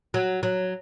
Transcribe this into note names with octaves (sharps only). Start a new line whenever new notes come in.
F#3
F#3